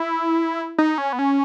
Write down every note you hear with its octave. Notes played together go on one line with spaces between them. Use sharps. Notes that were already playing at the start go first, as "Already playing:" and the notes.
Already playing: E4
D#4
C#4
B3
C#4